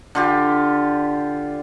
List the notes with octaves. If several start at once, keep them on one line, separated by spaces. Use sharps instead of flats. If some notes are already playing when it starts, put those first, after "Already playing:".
D3 F4 G4